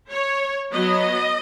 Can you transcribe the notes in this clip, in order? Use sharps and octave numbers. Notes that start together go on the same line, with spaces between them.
C#5
F#3 B3 D#5